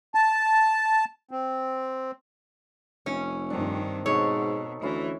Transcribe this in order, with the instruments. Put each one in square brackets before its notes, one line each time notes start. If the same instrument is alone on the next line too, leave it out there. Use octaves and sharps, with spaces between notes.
[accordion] A5
C4
[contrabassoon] F1 [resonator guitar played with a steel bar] C#4 [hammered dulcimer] E5
[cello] G2 D#3 [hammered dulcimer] C4 D4
[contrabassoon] G#2 [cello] B2 [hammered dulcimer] D#4 A4 [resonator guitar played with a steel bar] C#5
[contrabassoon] D2 [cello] E3 [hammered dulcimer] C#4 E4